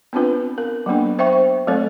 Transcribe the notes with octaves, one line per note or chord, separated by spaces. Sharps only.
B3 C4 D4 F4 B4
A#4
F#3 A#3 B3 D4
C5 E5 G5 C#6
F#3 A3 C4 A4 C#5